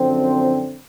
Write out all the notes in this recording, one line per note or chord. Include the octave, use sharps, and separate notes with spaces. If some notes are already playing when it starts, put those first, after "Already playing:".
Already playing: F#2 D3 F3 C4